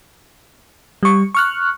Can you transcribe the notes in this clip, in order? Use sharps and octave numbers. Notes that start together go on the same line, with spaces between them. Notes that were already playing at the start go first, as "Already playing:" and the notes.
G3 C#6
C#6 F6 F#6